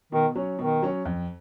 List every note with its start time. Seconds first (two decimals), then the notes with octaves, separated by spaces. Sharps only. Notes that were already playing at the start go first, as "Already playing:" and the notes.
0.12 B2 D#3
0.35 F#3 C#4
0.58 B2 D#3
0.82 F#3 C#4
1.05 F2